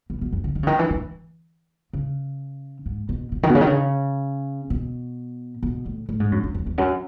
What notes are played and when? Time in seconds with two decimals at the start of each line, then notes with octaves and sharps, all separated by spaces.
0.10 B2
0.21 B2
0.33 F#2
0.44 C#3
0.55 D#3
0.63 C#3
0.67 D#3
0.79 E3
0.90 E3
1.93 C#3
2.86 G#2
3.09 B2
3.32 B2
3.43 D#3
3.49 B2
3.55 C#3
3.61 D#3
3.66 C#3
4.70 B2
5.63 B2
5.86 A2
6.09 A2
6.20 G#2
6.32 F#2
6.44 F#2
6.55 F#2
6.66 E2
6.78 F#2